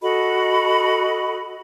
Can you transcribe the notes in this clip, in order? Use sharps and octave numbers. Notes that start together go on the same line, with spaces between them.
F#4 A4 D#5 B5